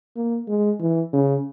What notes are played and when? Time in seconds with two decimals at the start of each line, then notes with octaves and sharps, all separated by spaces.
0.16 A#3
0.48 G#3
0.81 E3
1.13 C#3